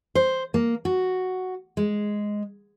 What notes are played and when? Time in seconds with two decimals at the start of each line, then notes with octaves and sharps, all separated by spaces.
0.15 C5
0.54 A#3
0.85 F#4
1.77 G#3